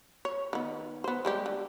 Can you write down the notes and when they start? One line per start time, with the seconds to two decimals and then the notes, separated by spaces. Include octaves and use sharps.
0.25 C#5
0.53 D#3 B3
1.04 B3 C5
1.25 G3 G#3 G4
1.46 D3